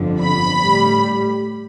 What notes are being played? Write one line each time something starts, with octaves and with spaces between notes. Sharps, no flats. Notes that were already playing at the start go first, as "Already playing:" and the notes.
Already playing: G1 F2 D3 F3
B5
A2 G3